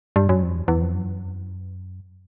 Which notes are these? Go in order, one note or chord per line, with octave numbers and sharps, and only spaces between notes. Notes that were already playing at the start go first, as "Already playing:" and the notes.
G2
F#2
F2
E2
E2
F2
F#2